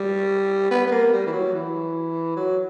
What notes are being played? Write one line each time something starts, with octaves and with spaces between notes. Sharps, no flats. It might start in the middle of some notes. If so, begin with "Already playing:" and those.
Already playing: G3
B3
B3
A#3
G3
E3
F#3
E3
F#3